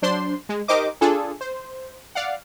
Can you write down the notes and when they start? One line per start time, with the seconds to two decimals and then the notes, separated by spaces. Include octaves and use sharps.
0.02 F#3 D4 C5 C6
0.49 G#3
0.68 D#4 G4 A#4 C5 D#5 D6
1.01 D4 F4 G#4 A4
1.41 C5
2.15 D5 F5 F#5